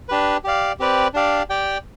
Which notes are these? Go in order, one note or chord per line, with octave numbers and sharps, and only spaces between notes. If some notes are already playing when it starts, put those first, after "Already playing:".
D4 G4 B4
G4 D5 F5
C4 G4 B4 D5
D4 G4 D5 F5
G4 D5 G5